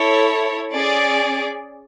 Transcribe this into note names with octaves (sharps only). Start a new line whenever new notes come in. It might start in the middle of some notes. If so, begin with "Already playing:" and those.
Already playing: E4 A4 C#5
C#4 G#4 D5